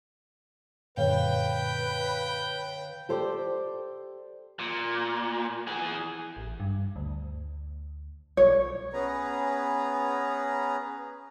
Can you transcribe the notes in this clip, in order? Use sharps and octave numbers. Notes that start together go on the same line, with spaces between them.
F#2 A#2 D3 B4 C#5 F5 G5
G4 A4 C5 D5
A#2
E3 G#4
A1
G2
D2
B1 C#5
B3 C#4 G#4 B4 A#5